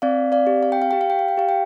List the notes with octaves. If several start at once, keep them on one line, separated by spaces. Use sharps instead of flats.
C4 D5 F5
D5 F5
G4
F5
G5
F5
G4 G5
F5
G5
F5
G5
G4 F5
G5